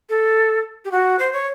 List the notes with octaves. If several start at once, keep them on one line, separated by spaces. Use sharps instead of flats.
A4
G4
F#4
C5
C#5